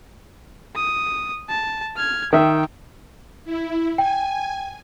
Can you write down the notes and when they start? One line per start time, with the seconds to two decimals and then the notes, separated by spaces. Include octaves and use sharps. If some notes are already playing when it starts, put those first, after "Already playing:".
0.76 D#6
1.49 A5
1.97 F6 G#6
2.33 D#3 E5 G5
3.45 E4
3.98 G5 G#5